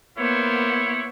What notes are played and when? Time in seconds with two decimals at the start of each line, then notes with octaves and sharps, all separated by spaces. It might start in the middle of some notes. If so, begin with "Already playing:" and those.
0.18 A#3 B3 E4 C5 C#5